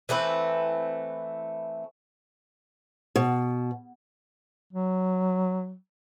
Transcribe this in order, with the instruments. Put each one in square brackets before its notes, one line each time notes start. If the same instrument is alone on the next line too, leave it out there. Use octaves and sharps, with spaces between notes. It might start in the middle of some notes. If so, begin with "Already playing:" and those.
[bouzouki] E3 A3 C4 B4
[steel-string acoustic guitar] B2
[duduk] F#3